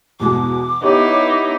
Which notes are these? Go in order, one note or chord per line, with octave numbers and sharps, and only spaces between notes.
E2 B2 G#3 D6
B3 D#4 E4 G4 C#5